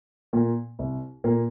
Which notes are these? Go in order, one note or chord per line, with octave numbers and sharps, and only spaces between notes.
A#2 A#3
C2
A#2 A#3